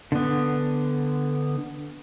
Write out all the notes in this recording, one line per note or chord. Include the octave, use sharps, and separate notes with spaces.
D3 B3